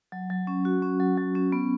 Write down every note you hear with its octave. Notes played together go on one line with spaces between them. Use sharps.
F#3
F#3
C#4
F#4
C#4
F#3
F#3
C#4
B3